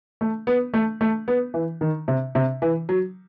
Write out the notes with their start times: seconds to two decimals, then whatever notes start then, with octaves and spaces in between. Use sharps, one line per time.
0.21 A3
0.47 B3
0.74 A3
1.01 A3
1.28 B3
1.54 E3
1.81 D#3
2.08 C3
2.35 C3
2.62 E3
2.89 F#3